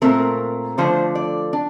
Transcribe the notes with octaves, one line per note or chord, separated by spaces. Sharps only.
A#2 A3 C4 A#4
D3 F3 A3 D4 C5
D5
D4